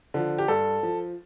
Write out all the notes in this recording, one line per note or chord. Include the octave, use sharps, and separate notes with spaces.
D3 F3
G4
G2 A4
F3